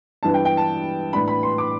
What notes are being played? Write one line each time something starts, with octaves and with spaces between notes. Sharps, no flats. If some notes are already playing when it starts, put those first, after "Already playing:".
G2 E3 B3 A5
G5
G5
A5
A2 E3 B3 D4 B5
B5
C6
D6